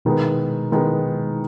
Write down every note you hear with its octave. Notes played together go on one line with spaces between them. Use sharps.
B2 D#3 G#3 B3
D#3 G#3 B3